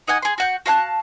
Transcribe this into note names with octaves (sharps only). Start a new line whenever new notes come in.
D#4 D#5 F#5 G#5
G#4 C6
F#4 F#5 G6
F#4 F5 A5 F#6